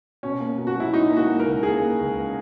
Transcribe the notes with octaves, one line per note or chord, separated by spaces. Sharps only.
B2 C#4
A#3
B2
F#4
F#3 E4
F#3 D#4
A#3
F#4
A#3
A#4
C#2
A#3 G#4
A#3
C#2